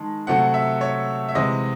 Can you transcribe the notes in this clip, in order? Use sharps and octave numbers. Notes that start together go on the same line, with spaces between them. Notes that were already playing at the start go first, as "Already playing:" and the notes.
Already playing: D#3 G#3 A5
C3 F#3 A3 F#5
E5
C#5
E5
C3 E3 G#3 D#5